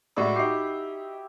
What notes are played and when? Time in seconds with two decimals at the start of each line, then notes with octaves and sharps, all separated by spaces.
0.16 A2 G#3 E4 F#4 D5 E5
0.36 D#4 G4 C7